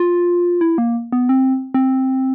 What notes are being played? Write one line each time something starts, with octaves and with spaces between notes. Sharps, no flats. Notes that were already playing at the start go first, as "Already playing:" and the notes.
Already playing: F4
E4
A#3
B3
C4
C4